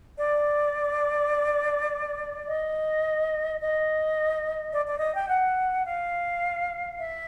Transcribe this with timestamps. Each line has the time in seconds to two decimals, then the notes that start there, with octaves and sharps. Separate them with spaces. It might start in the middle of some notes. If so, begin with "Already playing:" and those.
0.19 D5
2.46 D#5
3.58 D#5
4.72 D5
4.86 D5
5.00 D#5
5.15 G5
5.28 F#5
5.85 F5
6.98 E5